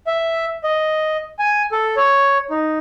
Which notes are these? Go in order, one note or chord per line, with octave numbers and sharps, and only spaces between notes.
E5
D#5
G#5
A4
C#5
D#4